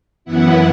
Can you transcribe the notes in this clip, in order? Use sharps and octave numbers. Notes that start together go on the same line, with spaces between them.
F#2 E3 B3 E4 F#5